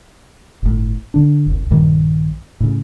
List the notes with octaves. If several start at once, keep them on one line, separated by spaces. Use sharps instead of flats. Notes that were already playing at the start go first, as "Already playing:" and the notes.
G1 A2
D3 D4
F#1 C2
A#1 G2 D#3 G3
A2 C#3